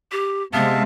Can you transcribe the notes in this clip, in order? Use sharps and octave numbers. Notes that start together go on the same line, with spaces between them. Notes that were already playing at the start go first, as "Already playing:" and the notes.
G4
C3 G#3 B3 E5 F5 A5